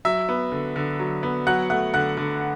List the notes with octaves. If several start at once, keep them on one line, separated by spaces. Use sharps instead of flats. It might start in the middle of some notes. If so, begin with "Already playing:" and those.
F#3 E5 E6
B3
D3
D3
F#3
B3
F#3 F#5 F#6
A3 F#5 F#6
D3 F#5 F#6
D3